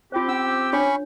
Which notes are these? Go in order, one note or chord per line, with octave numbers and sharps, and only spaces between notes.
C4 F4 G4 C5
C#4 E6
C#4 D4 C#5 B5 C#6